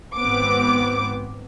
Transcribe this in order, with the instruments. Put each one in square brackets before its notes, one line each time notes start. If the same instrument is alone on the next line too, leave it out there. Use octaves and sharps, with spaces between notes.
[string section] G#1 B3 C4 D6